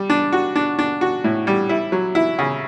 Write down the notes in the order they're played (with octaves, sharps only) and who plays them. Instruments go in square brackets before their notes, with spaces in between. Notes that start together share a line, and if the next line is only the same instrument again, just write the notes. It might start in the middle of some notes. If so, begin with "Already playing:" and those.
Already playing: [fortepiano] G3
D4
F#4
D4
D4
F#4
A2
G3
E4
F#3
E4
C#3